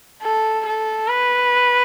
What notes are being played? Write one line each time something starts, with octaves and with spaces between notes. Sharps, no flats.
A4
A4
B4